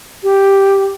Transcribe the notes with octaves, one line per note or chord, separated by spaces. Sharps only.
G4